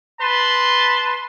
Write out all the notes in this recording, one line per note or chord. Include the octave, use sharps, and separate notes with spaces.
B4 A5 C6